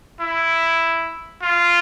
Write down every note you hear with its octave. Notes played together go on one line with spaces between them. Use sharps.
E4
F4